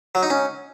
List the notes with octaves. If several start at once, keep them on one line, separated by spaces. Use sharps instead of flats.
F#3
D#4
C#4